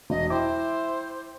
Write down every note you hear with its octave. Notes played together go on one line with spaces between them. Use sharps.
E1 D#5
E4 C5 E5 G5 D6